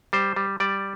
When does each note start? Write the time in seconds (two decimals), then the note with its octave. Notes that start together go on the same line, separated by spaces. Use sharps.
0.13 G3 C5
0.36 G3
0.60 G3 D5